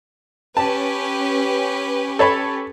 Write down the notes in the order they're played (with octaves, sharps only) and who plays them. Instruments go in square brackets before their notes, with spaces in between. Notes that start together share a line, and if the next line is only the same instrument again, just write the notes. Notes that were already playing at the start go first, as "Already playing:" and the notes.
[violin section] C#4 G4 B4 [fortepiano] A5
[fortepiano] A4 C#5 B5